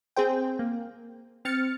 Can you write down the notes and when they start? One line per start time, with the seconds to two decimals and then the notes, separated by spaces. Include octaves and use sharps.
0.16 C4 G#4 C5 G5
0.59 A#3
1.45 C4 F6 A6 C#7